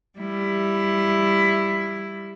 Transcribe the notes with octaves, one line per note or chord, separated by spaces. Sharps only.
G3 E4